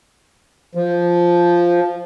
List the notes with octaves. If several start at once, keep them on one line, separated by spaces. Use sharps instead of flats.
F3